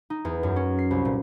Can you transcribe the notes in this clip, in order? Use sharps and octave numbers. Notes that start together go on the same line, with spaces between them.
D#4
E2
F#2
C#4
C7
C2
A#2